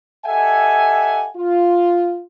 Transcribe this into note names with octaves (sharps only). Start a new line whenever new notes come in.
G4 A4 D#5 E5 F#5 G#5
F4